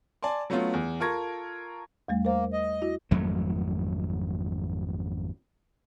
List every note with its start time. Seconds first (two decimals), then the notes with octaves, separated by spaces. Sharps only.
0.23 D5 G#5 A5 C6
0.50 F#3 A3 B3 C#4 F4
0.73 E2
1.00 F4 A4 A#4 C#6 G#6 A#6
2.08 E2 G3 A3
2.25 A#3 A#4 C5
2.53 D#5
2.82 E4 F#4
3.11 G#1 F2 F#3 A3